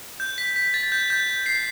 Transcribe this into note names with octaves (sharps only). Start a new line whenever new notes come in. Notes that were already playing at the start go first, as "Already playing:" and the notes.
G6
B6
B6
A6
G6
G6
C7